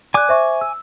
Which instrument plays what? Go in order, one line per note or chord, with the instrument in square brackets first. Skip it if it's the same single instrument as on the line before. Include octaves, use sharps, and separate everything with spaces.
[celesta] D5 F#6 [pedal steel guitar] G#5 D6
[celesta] C5 E5 C#6
E6